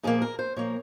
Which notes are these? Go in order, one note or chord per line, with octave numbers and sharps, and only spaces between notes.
A#2 F3 A#3 G#4
A#4
C5
A#2 F3 A#3 C#5